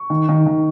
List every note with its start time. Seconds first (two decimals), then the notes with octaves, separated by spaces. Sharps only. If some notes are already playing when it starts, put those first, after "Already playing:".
Already playing: C#6
0.10 D#3
0.29 D#3
0.46 D#3